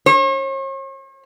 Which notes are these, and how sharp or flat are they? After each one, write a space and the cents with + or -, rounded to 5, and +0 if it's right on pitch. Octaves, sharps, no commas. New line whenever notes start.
C#5 -45